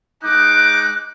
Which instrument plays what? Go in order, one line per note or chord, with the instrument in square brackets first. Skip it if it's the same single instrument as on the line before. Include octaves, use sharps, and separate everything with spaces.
[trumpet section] G#3 D#4 D6 [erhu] F#6